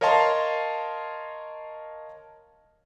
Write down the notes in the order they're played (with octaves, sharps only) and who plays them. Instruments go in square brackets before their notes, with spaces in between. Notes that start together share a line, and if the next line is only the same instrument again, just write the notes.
[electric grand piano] A#4 C#5 D#5 F5 A5 C6